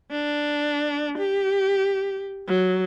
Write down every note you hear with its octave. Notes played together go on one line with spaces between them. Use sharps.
D4
G4
F#3